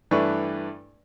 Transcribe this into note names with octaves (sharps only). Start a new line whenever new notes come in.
G2 E3 A3 D4 B4 C#6